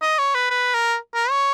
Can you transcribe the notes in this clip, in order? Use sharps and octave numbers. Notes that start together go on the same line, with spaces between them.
D#5
C#5
B4
B4
A#4
A#4
C#5